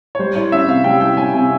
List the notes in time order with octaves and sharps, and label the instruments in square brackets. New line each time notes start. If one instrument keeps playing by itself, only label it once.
[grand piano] C#5
[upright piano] G3 [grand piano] C5
[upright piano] E4 [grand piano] C#5
[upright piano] C#4 [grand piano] E5
[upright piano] C3 [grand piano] F5
[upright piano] G3 [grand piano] G5
[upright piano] E4 [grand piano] G5
[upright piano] C#4 [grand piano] G#5
[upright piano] C3 [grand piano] G#5